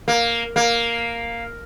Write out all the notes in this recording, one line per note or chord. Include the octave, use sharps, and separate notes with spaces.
A#3
A#3